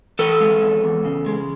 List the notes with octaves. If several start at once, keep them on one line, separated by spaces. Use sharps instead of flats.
E3 A4 B4
G#3
E2
E2
C#3
G#3